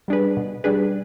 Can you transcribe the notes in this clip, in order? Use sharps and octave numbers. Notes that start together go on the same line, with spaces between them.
G3 D4 G#4 B4
B2
G3 D4 G#4 B4